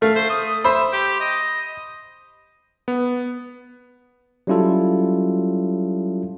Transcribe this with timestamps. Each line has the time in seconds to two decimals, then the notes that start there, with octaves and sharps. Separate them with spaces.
0.02 A3 F5
0.15 C5
0.30 D#6
0.64 C5 E5 B5
0.93 G4
1.21 D#5
2.88 B3
4.47 F#3 G3 C#4 E4 F4 A4